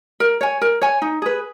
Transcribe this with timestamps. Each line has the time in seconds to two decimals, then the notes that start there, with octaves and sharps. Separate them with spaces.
0.20 A#4
0.41 C#5 G#5
0.61 A#4
0.81 C#5 G#5
1.02 D#4
1.22 G#4 B4